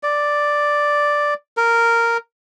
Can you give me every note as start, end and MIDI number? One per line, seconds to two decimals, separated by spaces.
0.03 1.34 74
1.57 2.17 70